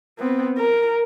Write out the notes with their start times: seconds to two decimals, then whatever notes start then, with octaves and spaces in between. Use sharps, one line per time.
0.18 B3 C4
0.57 A#4